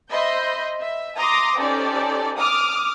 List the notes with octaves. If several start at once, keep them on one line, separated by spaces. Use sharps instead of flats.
C5 D#5 E5 B5 C6 G6
E5
A#5 C6 D6 D#6 A#6
C#4 D#4 G4 A4 C5 D5
D6 D#6 F6